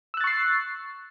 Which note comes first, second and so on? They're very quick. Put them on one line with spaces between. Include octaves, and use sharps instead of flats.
E6 F#6 A6 C#6 C7